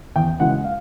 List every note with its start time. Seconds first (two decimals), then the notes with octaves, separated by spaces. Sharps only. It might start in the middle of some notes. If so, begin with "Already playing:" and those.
0.16 E2 G5
0.40 C#3 E3 G#3 F#5
0.64 F5